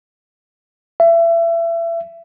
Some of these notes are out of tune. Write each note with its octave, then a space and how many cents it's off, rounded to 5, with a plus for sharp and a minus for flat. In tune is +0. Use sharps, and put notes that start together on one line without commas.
E5 +30